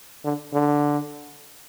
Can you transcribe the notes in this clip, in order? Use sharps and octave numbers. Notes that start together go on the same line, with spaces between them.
D3
D3